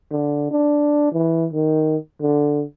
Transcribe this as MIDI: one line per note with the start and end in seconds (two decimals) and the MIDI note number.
0.11 0.49 50
0.51 1.08 62
1.12 1.47 52
1.53 1.97 51
2.21 2.64 50